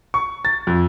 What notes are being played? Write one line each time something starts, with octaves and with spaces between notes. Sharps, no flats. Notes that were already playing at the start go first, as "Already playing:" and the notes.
C#6
A6
F2